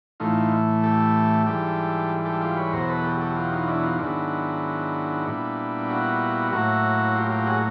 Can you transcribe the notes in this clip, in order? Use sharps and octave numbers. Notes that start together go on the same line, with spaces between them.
A2 E3 A3 D#4 F4
G4 A4
G#2 E3 G3 G4 A4
G4 A4
F4 G4
B4 C#5
E2 B2 F#3 A#4 C5
A4 B4
G4 A4
G4 A4
F4 G4
D#4 F4
D4 E4
D#4 F4
G#2 D#3 F#3 B3 D4 E4
A#2 G3 B3
E4 F#4
A2 F#3 A#3 E4 F#4
F4 G4
F4 G4
F#4 G#4